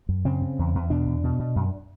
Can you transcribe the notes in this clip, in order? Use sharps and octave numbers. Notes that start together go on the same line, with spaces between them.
F#2
C#3 C4
C#3
E2
E2
B2 D4
E2
B2
B2
F#2